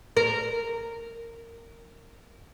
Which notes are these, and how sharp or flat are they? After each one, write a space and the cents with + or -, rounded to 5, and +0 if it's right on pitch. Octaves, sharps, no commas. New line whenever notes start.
A#4 -15